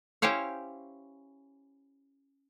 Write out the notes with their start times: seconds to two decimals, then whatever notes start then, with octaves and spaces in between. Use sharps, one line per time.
0.22 C#4 E4 G4 C5 C#5 F5